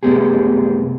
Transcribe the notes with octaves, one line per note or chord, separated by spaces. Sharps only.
C2 F#2 A3 B3 G4 G#4